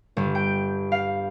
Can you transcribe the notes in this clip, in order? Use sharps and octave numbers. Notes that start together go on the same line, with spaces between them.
G1
G5
F5